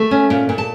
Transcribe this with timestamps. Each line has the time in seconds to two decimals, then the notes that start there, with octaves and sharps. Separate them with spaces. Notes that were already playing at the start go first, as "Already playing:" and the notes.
Already playing: A3
0.11 C#4
0.30 A#2
0.49 A#2
0.58 A5